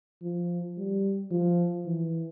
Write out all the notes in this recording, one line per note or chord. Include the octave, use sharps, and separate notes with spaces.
F3
G3
F3
E3